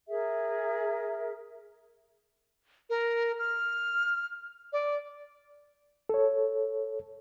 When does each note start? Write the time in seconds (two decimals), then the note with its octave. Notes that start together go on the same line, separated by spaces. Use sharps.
0.08 G#4 A#4 E5
2.90 A#4
3.39 F6
4.72 D5
6.09 A4 C#5